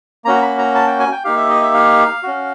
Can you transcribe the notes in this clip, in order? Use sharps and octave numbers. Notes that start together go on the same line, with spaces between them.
A#3 C#4 F#4 A#5
B5
A#5
A5
G5
G#5
G5
A#3 D#4 G4 F5
E5
D#5
E5
F5
C#4 F#4